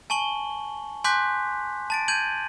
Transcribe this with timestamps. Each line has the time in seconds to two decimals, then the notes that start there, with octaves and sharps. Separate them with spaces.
0.10 G#5 A5 C#6 F#7 G7
1.04 G#5 C6 D6 F#6 G6 B6
1.90 A5 A6 D7
2.08 G6 G#6 D#7 F#7